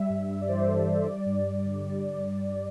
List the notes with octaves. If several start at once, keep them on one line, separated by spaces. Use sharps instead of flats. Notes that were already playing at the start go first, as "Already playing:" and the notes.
Already playing: G3 E5
G2
G2
D5
E3 C5
G3 A4
G2 C5
G3 D5
G2
G2
D3
G3
G2
G3
G2